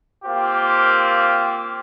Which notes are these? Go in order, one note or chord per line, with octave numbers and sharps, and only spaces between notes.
A#3 C4 F4 G4